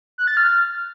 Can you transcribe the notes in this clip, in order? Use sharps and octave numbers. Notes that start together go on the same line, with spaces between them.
F#6
A6
F6